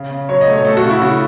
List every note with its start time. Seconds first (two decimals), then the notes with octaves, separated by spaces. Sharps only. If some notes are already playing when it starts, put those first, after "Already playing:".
Already playing: C#3
0.11 C#3
0.29 F#3 C#5
0.41 D#5
0.47 A3
0.53 C#5
0.65 A3 A4
0.77 F#4
0.83 C#3
0.90 E4
1.01 C#3 F#4